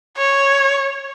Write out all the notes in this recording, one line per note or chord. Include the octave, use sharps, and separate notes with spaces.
C#5